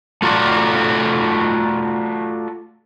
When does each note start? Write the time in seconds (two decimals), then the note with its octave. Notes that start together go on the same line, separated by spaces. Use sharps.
0.22 A3 F4 F#4 A4 D5